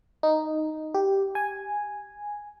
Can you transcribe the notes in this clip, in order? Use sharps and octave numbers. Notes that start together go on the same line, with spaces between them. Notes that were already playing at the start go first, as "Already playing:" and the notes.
D#4
G4
G#5